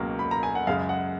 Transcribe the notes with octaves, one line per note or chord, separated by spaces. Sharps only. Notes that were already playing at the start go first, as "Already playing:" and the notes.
Already playing: C#2 B2 F#3 A#3
B5
A#5
G#5
F#5
F#2 C#3 G#3 F5
F#5